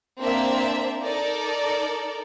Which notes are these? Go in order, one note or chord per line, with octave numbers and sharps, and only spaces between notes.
A#3 C4 D4 E5
D#4 A4 A#4 D5